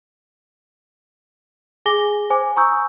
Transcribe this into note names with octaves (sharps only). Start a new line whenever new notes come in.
G#4 G#5 D6 A#6 G7
C5 G#5 D6
G#5 A#5 C#6 D#6 E6 G6